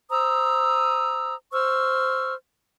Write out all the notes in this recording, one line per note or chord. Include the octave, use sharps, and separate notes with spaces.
C5 A#5 D#6 E6
C5 C#6 E6 F6